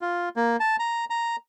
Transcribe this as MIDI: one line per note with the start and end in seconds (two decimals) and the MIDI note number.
0.01 0.29 65
0.36 0.56 58
0.60 0.76 81
0.79 1.05 82
1.10 1.36 82